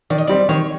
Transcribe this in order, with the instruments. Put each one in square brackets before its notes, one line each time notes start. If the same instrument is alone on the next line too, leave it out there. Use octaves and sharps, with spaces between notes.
[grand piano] D#3 [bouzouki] D5
[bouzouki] D#5
[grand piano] G3 C4 [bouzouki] D5
[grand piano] D#3 [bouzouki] C#5